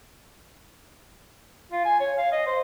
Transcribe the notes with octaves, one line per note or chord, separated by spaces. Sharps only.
F4
G#5
C#5
F5
D#5
C5